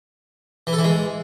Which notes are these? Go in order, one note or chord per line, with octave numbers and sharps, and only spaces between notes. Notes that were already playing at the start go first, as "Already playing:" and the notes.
E3
A4
E3
G#3